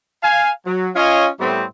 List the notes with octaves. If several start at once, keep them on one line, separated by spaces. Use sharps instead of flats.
F5 G#5
F#3
C#4 F4 C#5 D#5 F5 G#5
A2 G3 A3 B3 C4